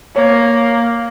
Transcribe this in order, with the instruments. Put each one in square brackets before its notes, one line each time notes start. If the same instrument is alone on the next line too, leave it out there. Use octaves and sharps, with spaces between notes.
[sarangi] A#3 [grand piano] C#5